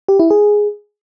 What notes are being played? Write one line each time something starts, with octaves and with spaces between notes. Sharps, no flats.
G4
E4
G#4